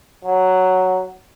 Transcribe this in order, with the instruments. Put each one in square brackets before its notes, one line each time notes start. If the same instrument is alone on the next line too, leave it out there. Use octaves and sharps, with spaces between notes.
[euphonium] F#3